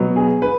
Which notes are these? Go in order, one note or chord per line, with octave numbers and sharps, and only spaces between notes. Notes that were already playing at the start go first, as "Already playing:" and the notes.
Already playing: B2 F#3 B3
G#4
B4